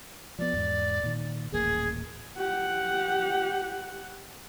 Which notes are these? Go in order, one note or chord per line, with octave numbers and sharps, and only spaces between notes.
F3 G3 B3 D5
E2 G#2
A#2 D#3
D#1 A1 A#3 G#4
G4 F#5